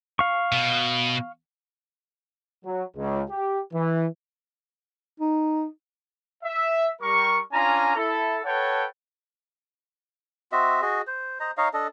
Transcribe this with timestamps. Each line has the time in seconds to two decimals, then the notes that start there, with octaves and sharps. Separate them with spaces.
0.19 F5 C#6
0.52 B2
2.64 F#3
2.96 C#2
3.30 G4
3.72 E3
5.20 D#4
6.44 E5
7.02 G3 A#4 C#6
7.53 C#4 D4 F4 G#5 A#5
7.96 E4 A4
8.45 A4 B4 C#5 F#5 G5 A5
10.52 C4 F#4 D#5 E5
10.82 F#4 G#4 D#5
11.07 C5
11.40 C5 D#5 A#5
11.57 D#4 C#5 D#5 F5
11.73 D4 A4 D#5